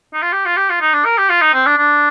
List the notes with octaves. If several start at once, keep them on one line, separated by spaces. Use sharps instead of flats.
D#4
F4
G4
F4
G4
F4
D#4
D4
A#4
G4
F4
D#4
C4
D4
D4